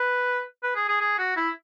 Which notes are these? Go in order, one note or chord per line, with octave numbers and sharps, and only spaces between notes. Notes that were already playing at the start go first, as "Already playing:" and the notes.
Already playing: B4
B4
G#4
G#4
G#4
F#4
E4